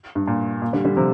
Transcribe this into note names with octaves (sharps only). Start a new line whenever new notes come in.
G2
A#2
A#2
D3 G3
D3 G3
C3 F3